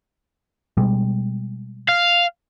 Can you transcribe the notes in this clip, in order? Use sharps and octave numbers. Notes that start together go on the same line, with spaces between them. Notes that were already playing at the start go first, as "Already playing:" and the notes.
B2 G3 G#3
F5